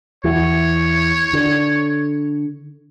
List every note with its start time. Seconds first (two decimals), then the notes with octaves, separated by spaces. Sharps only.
0.24 E2 E3 C#5
1.33 D3